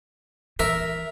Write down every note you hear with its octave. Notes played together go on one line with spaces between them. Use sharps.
E3 A#4 E5